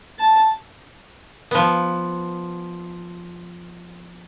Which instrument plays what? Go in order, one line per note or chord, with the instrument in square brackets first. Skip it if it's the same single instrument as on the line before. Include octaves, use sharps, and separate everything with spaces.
[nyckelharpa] A5
[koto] F3 B3